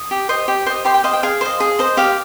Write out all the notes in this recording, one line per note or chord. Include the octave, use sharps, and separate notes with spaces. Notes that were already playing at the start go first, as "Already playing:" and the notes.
Already playing: D#6
G4
C5 D#5
G4
C5 D#5
G4 C6
G5
C5 D#5 F5
G5
G#4 F5
C5 D#5
G#4
C5 D#5
G4 F5